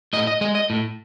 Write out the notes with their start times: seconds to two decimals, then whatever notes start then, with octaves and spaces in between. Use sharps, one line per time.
0.13 A2 D#5
0.27 D#5
0.41 G#3 D#5
0.55 D#5
0.70 A2